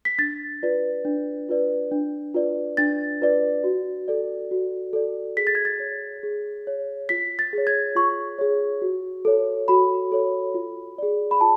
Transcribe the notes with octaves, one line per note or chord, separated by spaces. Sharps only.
B6
D4 A6
F4 B4 D5
D4
F4 B4 D5
D4
F4 B4 D5
D4 A6
F4 B4 D5
F#4
A4 D5
F#4
A4 D5
G#4 B6
A6
G#6
A6
C#5
G#4
C#5
F4 B6
A6
G#4 C#5
G#6
F4 C#6
G#4 C#5
F#4
A4 C#5
F#4 B5
A4 C#5
F4
G#4 D5
B5
F4 A5